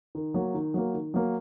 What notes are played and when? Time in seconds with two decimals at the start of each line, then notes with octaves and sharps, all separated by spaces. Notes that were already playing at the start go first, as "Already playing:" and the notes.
0.15 D#3
0.34 F#3 A#3
0.54 D#3
0.74 F#3 A#3
0.94 D#3
1.14 F#3 A#3